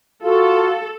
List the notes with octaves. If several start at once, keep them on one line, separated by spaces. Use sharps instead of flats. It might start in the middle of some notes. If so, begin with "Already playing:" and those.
F4 F#4 A4